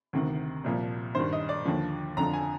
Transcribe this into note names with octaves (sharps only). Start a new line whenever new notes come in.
D2 C3 D#3
C2 A#2 F3
G2 D#3 C5
D#5
D5
D#2 D3 F3
F2 D3 F3 A#5
G#5